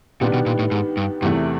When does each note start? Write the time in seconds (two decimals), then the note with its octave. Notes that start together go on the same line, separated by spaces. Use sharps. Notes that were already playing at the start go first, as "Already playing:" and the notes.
0.21 A#2 D#3 G3 B3 D4
0.34 B2
0.46 A#2
0.59 A2
0.71 G#2
0.97 G2
1.22 E2 G2 C3 E3 A3